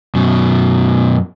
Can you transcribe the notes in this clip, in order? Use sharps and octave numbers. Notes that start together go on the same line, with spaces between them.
F#2 B2